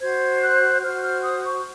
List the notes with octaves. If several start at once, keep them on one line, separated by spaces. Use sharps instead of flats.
F#4 C5 G#6
F#6
F#4 C5 F6
F6
D#6
C#6